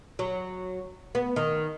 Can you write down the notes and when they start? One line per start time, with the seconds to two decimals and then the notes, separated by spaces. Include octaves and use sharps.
0.19 F#3
1.15 B3
1.36 D#3